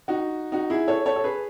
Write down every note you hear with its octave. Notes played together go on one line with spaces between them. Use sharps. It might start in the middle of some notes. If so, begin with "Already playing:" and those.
D#4 F#4
D#4 F#4
E4 G#4
A4 C#5
A4 C#5
A4
G#4 B4